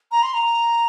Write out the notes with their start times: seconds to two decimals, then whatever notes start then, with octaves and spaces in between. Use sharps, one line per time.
0.12 A#5
0.23 C6
0.34 A#5